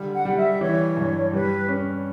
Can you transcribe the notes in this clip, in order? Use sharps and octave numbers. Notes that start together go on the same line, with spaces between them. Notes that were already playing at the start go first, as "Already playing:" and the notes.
Already playing: D3 G3
F#5
G3
E5
E3 C#5
G2
G3 B4
C#4